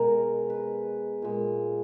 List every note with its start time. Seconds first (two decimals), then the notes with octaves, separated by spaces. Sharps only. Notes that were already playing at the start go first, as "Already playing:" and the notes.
Already playing: B2 G#3 A#4
0.50 B4
1.22 A#2 G#3